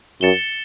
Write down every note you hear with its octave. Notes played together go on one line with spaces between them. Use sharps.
F#2 A6 C#7 E7 G7